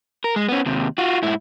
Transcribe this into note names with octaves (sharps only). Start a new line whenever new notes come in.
A#4
G#3
B3 C#4
D#2 C3
F4 F#4
G#2 E4